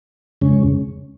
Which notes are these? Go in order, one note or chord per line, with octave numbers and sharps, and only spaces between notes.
F2 C#3 G#3 C#4